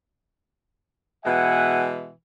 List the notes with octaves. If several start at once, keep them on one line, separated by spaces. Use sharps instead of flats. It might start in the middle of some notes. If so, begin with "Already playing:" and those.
B2 E3 G#3 E5 F#5 G#5